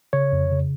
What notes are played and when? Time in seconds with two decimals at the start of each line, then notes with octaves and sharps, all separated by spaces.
0.13 C#3 C#5
0.32 F2
0.52 C#3